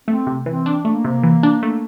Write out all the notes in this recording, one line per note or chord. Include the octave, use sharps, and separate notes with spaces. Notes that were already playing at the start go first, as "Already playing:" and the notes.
A3 C4
C3
E3 C4
D4
A3 A#3
C3
E3
D4
A3